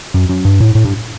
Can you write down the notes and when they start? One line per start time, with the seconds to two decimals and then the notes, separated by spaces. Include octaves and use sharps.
0.14 F#2
0.29 F#2
0.45 G2
0.60 A2
0.75 A2
0.85 G2